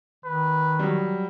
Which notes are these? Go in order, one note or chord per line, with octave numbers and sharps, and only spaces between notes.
D#3 B4
F#3 G3